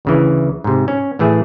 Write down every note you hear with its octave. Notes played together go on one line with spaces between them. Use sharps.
D2 C#3 E3
G#2 C3
C#4
A2 E3 A3 G#4 E5